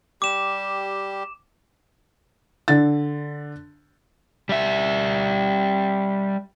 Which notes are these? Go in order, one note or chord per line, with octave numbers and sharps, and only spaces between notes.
G3 G4 D6 E7
D3 A6
G3 E5